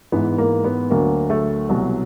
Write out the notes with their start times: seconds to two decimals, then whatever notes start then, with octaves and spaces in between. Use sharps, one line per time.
0.12 G#2 E3 B3
0.38 A#3
0.64 B3
0.91 D2 D3 F#3 A#3
1.30 A3
1.69 C2 B2 F#3